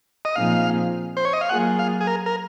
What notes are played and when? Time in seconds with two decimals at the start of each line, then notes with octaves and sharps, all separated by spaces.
0.25 D#5
0.36 A#2 F3 C4 D#4 G#4 F5
1.17 C5
1.25 C#5
1.33 D#5
1.41 F5
1.49 F#3 A#3 F4 G#4 F#5
1.79 F5
2.01 G#4
2.07 A#4
2.26 A#4